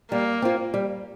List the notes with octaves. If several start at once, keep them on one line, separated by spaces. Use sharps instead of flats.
G3 A#3
C4 F4
G3